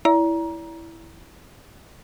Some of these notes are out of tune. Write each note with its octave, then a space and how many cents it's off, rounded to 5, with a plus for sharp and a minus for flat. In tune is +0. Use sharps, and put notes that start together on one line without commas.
E4 +0 D5 -35 A#5 +20